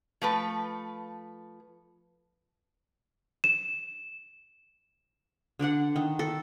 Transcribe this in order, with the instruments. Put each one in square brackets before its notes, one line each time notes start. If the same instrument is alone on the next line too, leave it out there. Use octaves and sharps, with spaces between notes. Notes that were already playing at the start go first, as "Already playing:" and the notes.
[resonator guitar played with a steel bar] F3 A3 B4
[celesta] E7
[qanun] D3 D4 D5 F#5
D#3
A4